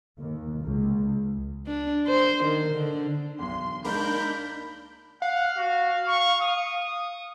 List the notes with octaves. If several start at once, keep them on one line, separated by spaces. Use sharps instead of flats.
D#2
C#2
D4
C5
D#3
D3
B1 E2 C6
C#2 A#3 D4 D#4 G#4 A#4 B5 G6
F5 F#5
F#4
C#6
D#6